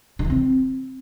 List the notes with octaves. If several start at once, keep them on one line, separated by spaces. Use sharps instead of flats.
D3
E3
C4